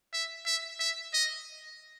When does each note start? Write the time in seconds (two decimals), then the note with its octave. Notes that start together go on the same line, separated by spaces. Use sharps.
0.14 E5
0.46 E5
0.80 E5
1.14 D#5